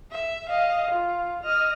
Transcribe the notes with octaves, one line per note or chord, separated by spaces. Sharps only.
E5
D#5 F5
F4
D#5 F6